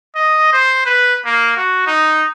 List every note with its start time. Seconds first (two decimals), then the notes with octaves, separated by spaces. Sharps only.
0.15 D#5
0.53 C5
0.85 B4
1.25 A#3
1.57 F#4
1.86 D#4